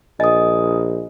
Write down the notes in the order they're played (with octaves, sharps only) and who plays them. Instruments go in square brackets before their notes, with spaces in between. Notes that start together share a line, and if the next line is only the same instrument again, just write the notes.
[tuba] A#1 [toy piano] D#5 [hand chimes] G#5 D#6